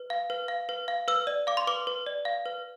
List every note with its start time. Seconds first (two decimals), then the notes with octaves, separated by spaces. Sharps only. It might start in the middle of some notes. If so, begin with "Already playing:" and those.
Already playing: B4
0.10 F5
0.30 B4
0.48 F5
0.69 B4
0.88 F5
1.08 B4 E6
1.27 D5
1.47 F5 D6
1.57 C6
1.67 B4 D6
1.87 B4
2.06 D5
2.25 F5
2.46 B4